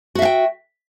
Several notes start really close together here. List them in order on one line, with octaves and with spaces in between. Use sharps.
F#4 E5 F5 G5